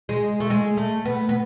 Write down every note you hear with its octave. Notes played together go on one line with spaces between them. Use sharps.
G#3
A3
G#3
A3
B3
B3